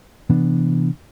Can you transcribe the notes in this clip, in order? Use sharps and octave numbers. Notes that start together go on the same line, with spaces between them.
C3 E3 B3 D4